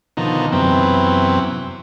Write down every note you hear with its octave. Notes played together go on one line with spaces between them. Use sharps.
B2 D3 D#3 F3 D#4
F#2 C3 E3 B3 C4